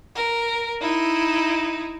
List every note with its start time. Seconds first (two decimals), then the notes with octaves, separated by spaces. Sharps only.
0.16 A#4
0.81 D#4 E4